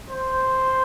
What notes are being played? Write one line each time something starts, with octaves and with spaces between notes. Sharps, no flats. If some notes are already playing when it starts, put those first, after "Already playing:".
C5